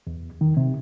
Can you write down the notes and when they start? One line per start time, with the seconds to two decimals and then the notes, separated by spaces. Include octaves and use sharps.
0.07 E2
0.41 D#3
0.57 C3